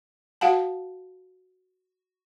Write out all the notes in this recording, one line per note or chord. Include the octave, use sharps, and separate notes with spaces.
F#4 F5 F#5 A5